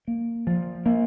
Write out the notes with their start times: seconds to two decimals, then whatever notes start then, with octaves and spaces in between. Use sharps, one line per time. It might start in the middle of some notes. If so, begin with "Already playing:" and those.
0.08 A#3
0.47 F3
0.86 A#3